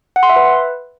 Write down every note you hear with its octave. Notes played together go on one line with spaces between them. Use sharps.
F#5
C6
E5
B4